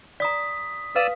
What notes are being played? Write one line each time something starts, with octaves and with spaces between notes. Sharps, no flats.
D5 A#5 D#6 B6
B4 D5 F5 D#6 E6